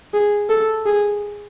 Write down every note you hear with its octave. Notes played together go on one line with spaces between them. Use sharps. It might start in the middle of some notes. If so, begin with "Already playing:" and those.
G#4
A4
G#4